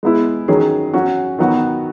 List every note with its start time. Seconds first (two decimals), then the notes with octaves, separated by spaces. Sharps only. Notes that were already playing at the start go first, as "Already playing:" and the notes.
0.03 G#3 B3 E4
0.48 D#3 F#3 C#4 G#4
0.94 F#3 C#4 F#4
1.39 D#3 F#3 B3 F#4